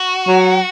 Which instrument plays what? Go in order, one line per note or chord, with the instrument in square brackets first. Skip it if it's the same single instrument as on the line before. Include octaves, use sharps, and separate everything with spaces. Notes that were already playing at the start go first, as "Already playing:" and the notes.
Already playing: [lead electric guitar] F#4
[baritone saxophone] F#3